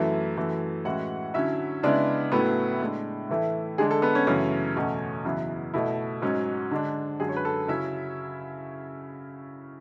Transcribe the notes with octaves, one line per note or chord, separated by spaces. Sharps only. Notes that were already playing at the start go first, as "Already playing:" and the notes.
Already playing: F#2 E3 A3 E4
F#2 E3 A3
A2 E3 G#3 C#4 F#4 F#5
D3 F#3 C#4 E4 E5
C#3 G#3 B3 D4 E4 D5
A2 F#3 A3 B3 C#4 E4 B4
A2 G#3 D4
A2 E3 A3 E4
D3 G#3 D4 G#4
A4
B3 B4
C#4 C#5
F#2 C#3 E3 A3 C#4 C#5
E2 B2 A3 C#4
F#2 C#3 E3 B3 E4
B2 A3 E4
G#2 F#3 C#4
D3 G#3 D4
F#2 D3 G#3 G#4
C#5
B4
A4
C#3 F#3 C#4 E4 E5